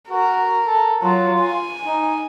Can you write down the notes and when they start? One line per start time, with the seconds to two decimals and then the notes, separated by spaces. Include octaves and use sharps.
0.10 F#4 A#4
0.66 A4
1.02 F#3 F4
1.41 G#5
1.85 D#4